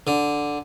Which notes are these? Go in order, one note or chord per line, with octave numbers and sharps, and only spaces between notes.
D3